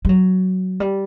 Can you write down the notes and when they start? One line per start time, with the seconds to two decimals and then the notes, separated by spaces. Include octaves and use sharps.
0.05 G3
0.09 F#3
0.80 G3